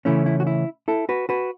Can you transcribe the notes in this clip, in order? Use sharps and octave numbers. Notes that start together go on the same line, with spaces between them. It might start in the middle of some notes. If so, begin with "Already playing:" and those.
C#3 E3 A3 C#4 E4
E4
F#4
E4
E4 A4
F#4 B4
F#4 B4